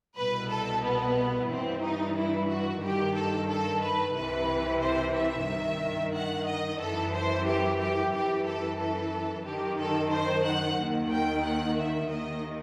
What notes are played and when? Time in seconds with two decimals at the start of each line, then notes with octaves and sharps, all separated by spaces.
0.17 C2 B2 B4
0.50 A4
0.82 B3
1.49 G2 E3 C4
1.82 D#4
2.15 E4
2.49 F#4
2.81 G2 D#3 G4
3.15 A4
3.49 A4
3.82 B4
4.15 C2 C3 E3 B4
4.81 C5
5.15 E5
5.47 G2 D#3
6.14 F#5
6.46 D#5
6.79 F#2 E3 A4
7.14 C5
7.46 G4
7.79 G4
8.13 F#2 E3 G4
8.46 A4
8.79 A4
9.44 F#2 D#3 G4
9.78 A4
10.11 C5
10.44 F#5
10.78 D#2 D#3
11.11 G5
11.45 F#5
11.78 E5
12.10 D#2 D#3 D#5